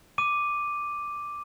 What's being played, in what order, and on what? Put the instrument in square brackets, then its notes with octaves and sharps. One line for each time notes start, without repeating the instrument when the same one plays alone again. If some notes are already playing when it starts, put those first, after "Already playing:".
[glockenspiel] D6 D#7